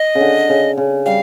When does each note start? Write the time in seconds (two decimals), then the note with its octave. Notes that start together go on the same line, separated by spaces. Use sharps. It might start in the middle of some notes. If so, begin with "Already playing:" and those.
Already playing: D#5
0.15 C#3
0.21 D3
0.49 C#3
0.77 C#3
1.06 G3 F5